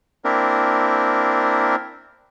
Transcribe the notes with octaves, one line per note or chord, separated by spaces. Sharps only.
A#3 C4 D4 E4 A#4